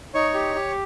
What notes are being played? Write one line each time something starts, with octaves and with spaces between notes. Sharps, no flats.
D#4 C#5 C#6
G4
G4